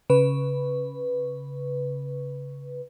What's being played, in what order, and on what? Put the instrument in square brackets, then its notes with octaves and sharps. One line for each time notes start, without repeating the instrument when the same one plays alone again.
[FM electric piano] C#3 B4